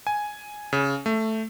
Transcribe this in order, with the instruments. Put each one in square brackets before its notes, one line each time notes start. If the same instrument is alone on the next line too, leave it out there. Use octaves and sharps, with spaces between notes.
[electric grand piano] G#5
C#3
A3